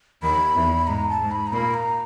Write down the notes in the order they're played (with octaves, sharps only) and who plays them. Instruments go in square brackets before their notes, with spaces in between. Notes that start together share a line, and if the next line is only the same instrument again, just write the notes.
[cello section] D#2 D#3 [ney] B5
[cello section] E2 E3
[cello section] G#2 G#3 [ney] A#5
[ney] A5
[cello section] G#2 G#3
[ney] B5
A#5
[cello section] A#2 A#3 [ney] B5
[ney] A#5